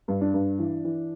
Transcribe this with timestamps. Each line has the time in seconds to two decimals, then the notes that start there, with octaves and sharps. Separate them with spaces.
0.08 G2
0.21 D4
0.34 G2
0.59 E3
0.85 E3